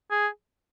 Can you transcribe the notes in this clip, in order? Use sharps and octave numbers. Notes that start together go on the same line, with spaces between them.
G#4